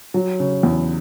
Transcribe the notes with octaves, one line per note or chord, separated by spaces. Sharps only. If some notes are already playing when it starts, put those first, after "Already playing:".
F#3
C#3
E2